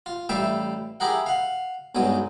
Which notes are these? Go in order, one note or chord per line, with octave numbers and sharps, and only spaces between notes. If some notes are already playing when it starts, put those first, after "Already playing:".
F4
A1 G3 E5 F5 G5 A5
E4 G4 G#4 A#4 F#5
F5 F#5
B1 G2 F#3 G#3 D#6